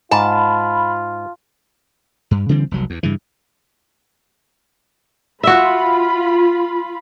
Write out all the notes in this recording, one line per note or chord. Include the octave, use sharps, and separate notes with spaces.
G#2 F4 A5 B5
G2
C#3 E3 G3 C4
F1 C2 F#3
E2
G2 C#3 E3
F4 F#4 E5 B5